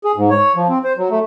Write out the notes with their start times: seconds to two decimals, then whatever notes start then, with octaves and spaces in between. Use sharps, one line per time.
0.04 G#4
0.16 G#2
0.30 C#5
0.56 F3
0.69 C4
0.84 C5
0.97 F#3
1.10 A3